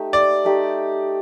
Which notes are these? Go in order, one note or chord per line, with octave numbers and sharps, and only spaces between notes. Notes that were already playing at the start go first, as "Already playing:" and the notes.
Already playing: A3 D#4 G4
D5
A3 D#4 G4